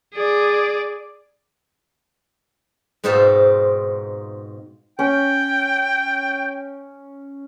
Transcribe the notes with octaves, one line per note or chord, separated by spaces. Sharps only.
G#4 D5
G#2 B2 C4 D#4 F4 E5
C#4 G5